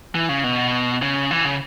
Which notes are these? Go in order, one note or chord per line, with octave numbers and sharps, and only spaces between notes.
E3
C#3
B2
C#3
E3
C#3